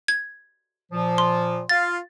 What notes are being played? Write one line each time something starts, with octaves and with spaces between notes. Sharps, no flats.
G#6
A#2 F3
C6
F4 F5 A6